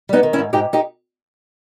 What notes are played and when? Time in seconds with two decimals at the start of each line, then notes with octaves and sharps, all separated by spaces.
0.09 G3 B3 D#4
0.23 D#3
0.33 C#4 E4
0.39 G#2
0.53 G#2 D#4 G4
0.73 D#4 G4